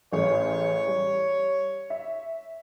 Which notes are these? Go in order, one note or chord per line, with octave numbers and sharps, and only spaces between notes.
A1 G#4 C#5
G3
E5